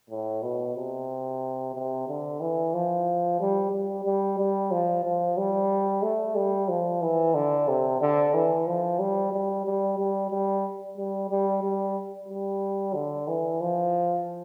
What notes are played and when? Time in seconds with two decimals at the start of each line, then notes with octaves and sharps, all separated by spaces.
0.10 A2
0.42 B2
0.75 C3
1.74 C3
2.07 D3
2.40 E3
2.73 F3
3.40 G3
3.72 G3
4.04 G3
4.38 G3
4.71 F3
5.04 F3
5.37 G3
6.02 A3
6.35 G3
6.68 F3
7.02 E3
7.34 D3
7.68 C3
8.01 D3
8.34 E3
8.66 F3
8.99 G3
9.32 G3
9.65 G3
9.98 G3
10.31 G3
10.97 G3
11.30 G3
11.63 G3
12.28 G3
12.94 D3
13.27 E3
13.60 F3